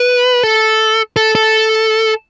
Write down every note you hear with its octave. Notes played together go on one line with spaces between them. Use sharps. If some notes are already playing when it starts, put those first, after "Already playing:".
Already playing: B4
A4
A4
A4